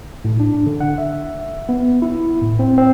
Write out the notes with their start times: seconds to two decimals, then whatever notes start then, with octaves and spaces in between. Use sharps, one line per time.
0.24 A2
0.40 D4
0.66 D3
0.80 F#5
0.98 E5
1.69 B3
2.02 E4
2.42 A2
2.59 C4
2.78 C4